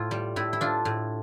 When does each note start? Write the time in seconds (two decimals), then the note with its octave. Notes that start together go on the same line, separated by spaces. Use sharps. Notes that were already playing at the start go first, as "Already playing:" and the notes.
Already playing: A2 F4
0.11 G3
0.36 A2 E4
0.53 E4
0.61 D4 F4
0.85 A2